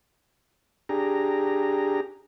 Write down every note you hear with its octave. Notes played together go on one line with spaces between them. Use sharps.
D4 G4 G#4 A#5